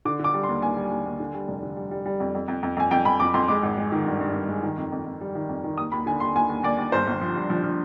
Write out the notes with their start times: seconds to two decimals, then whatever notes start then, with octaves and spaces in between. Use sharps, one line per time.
0.05 D3 D6
0.19 D3 D6
0.34 G3
0.43 C6
0.49 D#2
0.62 D#2 G#5
0.77 G3
0.91 D#2
1.05 D#2
1.20 D3
1.34 G3
1.48 F1
1.63 D3
1.77 G3
1.91 G3
2.06 G3
2.20 F2
2.35 F2
2.48 F2
2.63 F2
2.77 F2 G#5
2.91 F2 G5
3.05 F2 B5
3.20 F2 D6
3.34 F2 C6
3.48 G#3 D6
3.63 G#1
3.78 G#3
3.92 D#3
4.06 G2
4.21 G2
4.35 G2
4.48 G#3
4.63 D#3
4.78 F2
4.92 F2
5.06 F2
5.21 G3
5.35 D#3
5.49 F2
5.64 D#3
5.78 D#2 D#6
5.92 D#2 B5
6.06 D3 G#5
6.20 D#2 C6
6.35 D#2 G#5
6.49 D#2
6.63 D#2 D5
6.78 D#2
6.92 G1 C5
7.07 G1
7.21 F3
7.35 G2
7.50 F3
7.63 F3